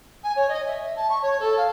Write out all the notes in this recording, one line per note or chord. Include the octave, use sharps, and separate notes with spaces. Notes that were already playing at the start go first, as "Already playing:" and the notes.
G#5
C#5
D#5
E5
A5
C#6
C#5
A4
F5